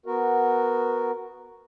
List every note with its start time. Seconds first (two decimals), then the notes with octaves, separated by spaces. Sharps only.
0.06 B3 F#4 A#4